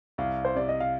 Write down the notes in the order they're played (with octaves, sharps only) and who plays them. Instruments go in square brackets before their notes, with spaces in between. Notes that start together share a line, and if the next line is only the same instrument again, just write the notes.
[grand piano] C2 [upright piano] F5
[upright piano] C5
[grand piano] C3 [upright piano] D5
[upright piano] D#5
F5